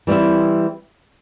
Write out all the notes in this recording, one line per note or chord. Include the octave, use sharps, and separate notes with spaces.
E3 G3 C4 E4